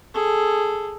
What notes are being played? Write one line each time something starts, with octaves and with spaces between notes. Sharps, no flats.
G#4 A4